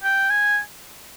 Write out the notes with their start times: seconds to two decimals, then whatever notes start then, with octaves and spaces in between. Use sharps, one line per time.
0.03 G5
0.30 G#5